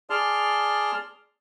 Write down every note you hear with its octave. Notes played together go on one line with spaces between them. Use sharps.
G#4 D5 A5 C6 F6